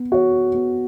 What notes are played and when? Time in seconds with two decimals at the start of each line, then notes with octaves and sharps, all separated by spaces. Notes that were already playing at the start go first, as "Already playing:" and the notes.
Already playing: B3
0.12 F#4 C#5
0.55 B3